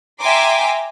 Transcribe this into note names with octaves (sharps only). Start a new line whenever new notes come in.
E5 G5 G#5 A#5 C6 D6